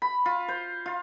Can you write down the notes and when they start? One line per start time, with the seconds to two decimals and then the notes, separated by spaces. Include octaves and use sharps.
0.02 B5
0.26 F4
0.48 C5
0.86 F4